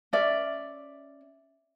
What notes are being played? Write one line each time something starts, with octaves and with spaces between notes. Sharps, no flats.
C#4 D5 E5